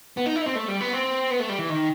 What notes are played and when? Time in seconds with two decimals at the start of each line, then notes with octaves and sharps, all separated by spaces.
0.17 B3
0.26 D#4
0.36 E4
0.41 D#4
0.46 C4
0.55 A3
0.68 G3
0.81 B3
0.93 C4
1.30 B3
1.40 A3
1.49 G3
1.59 E3
1.69 D#3